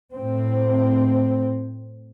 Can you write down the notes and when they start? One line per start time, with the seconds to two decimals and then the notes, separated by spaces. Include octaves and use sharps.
0.14 A2 C4